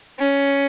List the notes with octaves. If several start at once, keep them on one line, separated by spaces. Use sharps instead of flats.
C#4